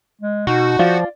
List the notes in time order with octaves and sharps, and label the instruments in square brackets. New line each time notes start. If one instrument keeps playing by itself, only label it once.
[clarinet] G#3
[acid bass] B2 [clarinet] D#4 [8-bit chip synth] F#4
[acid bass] F3 [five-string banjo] F4 [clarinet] D5